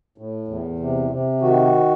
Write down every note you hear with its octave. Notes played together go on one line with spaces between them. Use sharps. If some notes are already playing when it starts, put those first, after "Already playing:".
A2
E2
C3
C3
D#3 F#4